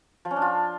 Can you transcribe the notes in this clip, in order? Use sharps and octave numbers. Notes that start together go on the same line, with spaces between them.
F3
C#4
D4
F4